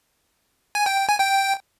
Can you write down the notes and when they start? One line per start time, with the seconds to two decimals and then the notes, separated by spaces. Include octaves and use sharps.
0.75 G#5
0.86 G5
0.97 G5
1.09 G#5
1.20 G5